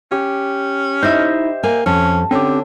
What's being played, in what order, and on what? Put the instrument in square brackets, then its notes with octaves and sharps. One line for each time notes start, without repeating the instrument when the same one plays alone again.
[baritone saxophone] C#4 [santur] G4
[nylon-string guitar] D#4 E4 [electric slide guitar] C5 D#5 E5
[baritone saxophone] A#3 [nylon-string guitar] A#4 G#5
[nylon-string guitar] F2 [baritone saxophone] C#4 [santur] A5
[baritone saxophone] D3 [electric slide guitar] C4 G4 [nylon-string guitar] C#4